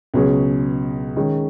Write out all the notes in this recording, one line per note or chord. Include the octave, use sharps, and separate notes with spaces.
C#2 B2 F#3 C#4 G#4
D#3 G#3 C#4